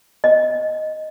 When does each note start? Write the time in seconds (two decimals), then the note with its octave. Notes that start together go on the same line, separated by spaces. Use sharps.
0.24 D#5